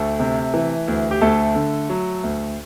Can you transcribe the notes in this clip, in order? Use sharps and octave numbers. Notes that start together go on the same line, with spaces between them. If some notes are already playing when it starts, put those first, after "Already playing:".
Already playing: D2 A3 A4
C3
E3
D2
G4
D2 A3 A4
D3
F#3
D2